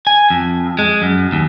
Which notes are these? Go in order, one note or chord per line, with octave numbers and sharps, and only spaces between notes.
G#5
F2
G#3
F#2
D#2